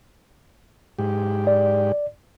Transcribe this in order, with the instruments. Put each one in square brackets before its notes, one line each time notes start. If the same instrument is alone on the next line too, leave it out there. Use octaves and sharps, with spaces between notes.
[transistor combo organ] G#2 G4
[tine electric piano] D5